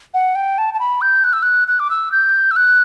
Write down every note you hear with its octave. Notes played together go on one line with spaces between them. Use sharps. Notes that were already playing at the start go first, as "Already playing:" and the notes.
F#5
G5
A5
A5
B5
G6
F#6
E6
F#6
F#6
D6
E6
G6
E6
F#6